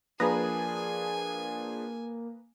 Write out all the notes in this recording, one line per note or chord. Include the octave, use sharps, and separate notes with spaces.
F3 A#3 D4 G#4 B4 G#5 A#5 D#6